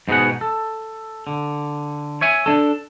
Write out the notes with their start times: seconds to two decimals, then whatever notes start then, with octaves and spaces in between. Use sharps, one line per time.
0.08 G#2 B2 D#4 G#4 F#5
0.41 A4
1.27 D3
2.21 C#5 E5 G#5
2.46 D4 A4